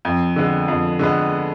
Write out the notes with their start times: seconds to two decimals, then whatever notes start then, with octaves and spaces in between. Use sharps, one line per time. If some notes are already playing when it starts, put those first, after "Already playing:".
0.05 F2
0.36 D3 G#3 B3
0.68 F2
0.99 D3 G#3 B3